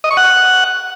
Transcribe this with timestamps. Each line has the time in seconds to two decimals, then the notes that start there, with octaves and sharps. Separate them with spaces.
0.04 D#5
0.11 C#6
0.17 F#5